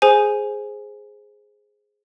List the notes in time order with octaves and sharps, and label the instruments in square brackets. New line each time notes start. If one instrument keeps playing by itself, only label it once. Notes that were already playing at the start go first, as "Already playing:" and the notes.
[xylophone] G#4 C5 G#5